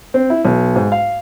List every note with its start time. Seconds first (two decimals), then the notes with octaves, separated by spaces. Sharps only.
0.14 C4
0.30 E4
0.45 B1
0.76 G#2
0.92 F5